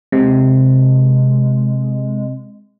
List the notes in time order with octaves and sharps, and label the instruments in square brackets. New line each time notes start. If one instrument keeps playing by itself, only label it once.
[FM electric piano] C3 [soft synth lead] G#3